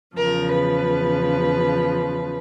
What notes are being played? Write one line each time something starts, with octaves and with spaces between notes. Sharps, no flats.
E2 C#3 F3 A#4
B4